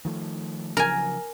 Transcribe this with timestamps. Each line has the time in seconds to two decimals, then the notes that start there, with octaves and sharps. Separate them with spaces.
0.05 D#3 F3 A3
0.77 C#3 F3 F#3 A#4 G#5